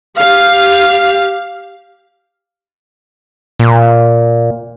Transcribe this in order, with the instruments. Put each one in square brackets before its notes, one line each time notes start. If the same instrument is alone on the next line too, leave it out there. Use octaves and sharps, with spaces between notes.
[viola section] G4 F5
[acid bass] A#2